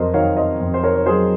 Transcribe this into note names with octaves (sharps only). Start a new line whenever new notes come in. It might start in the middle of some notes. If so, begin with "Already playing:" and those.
Already playing: F2 F#3 A#4 C5 D#5
D#3 C#5 F5
C5 D#5
F2
C5
A#4 C#5
C#5
F#3 G#4 C5